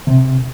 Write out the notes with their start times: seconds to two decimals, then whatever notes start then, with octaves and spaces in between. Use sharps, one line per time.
0.07 C3